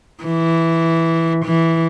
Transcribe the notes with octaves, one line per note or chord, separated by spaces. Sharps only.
E3
E3